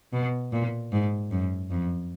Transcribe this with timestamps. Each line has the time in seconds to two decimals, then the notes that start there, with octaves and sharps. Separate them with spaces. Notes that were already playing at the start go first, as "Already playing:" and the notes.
0.13 B2
0.53 A#2
0.92 G#2
1.31 F#2
1.71 F2